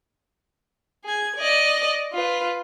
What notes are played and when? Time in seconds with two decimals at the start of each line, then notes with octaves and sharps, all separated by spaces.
1.04 G#4 G#6
1.36 D5 D#5
2.12 F4 B4